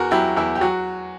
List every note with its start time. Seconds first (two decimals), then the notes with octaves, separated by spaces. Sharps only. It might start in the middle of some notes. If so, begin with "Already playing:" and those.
Already playing: E2 F#4 A#4
0.11 F#3 E4 G4
0.37 E2 E4
0.55 G4
0.61 F#3 F#4